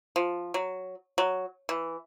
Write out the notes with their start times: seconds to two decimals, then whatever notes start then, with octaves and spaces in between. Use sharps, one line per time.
0.16 F3
0.54 F#3
1.18 F#3
1.69 E3